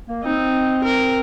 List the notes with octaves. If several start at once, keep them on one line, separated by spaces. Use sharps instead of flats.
A#3
C4 D#4
A#4